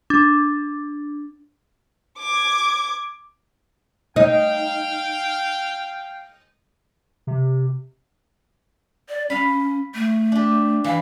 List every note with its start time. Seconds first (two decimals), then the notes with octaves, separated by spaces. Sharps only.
0.10 D4
2.19 D6 G#6
4.16 D#4 F5 G5
7.27 C3
9.09 D5
9.30 C#4 F5 B5
9.95 A3
10.32 D4 G4
10.84 E3 F5